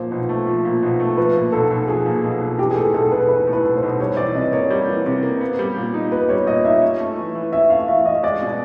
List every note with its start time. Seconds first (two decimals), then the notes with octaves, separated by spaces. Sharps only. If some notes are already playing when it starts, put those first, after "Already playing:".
Already playing: A#2 F3 C5
0.11 B1
0.29 A3
0.47 F3
0.65 A#2
0.83 B1
1.00 A3
1.17 F3 B4
1.35 A#2
1.52 B1 A4
1.70 B1
1.87 F3 G#4
2.06 A#2
2.23 B1
2.41 B1
2.58 E3 G4
2.70 G#4
2.76 A2 A4
2.93 B1 A4
3.12 B1 B4
3.29 E3 B4
3.47 A2
3.53 B4
3.64 B1
3.76 C5
3.82 B1
4.00 G3 C#5
4.17 E3 D5
4.35 C3 D#5
4.53 A#3 C#5
4.70 G3
4.88 E3
5.06 C3
5.23 A#3
5.41 B3
5.59 G3
5.76 A#2
5.94 D#4
6.12 B3 B4
6.29 G3 C#5
6.47 A#2 D#5
6.65 D#4 E5
6.82 C#4
7.00 A3
7.17 E3
7.35 E3
7.53 C#4 E5
7.70 A3 F5
7.88 E3 E5
8.06 E3 D#5
8.23 G#3 D5
8.41 B2